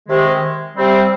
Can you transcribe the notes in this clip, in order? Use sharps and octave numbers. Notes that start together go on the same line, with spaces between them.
C3 D#3 G#3
C3 G3 C4